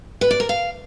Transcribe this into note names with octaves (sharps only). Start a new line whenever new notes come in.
B4
D5
A#4
F5